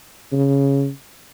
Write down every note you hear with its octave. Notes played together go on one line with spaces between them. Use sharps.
C#3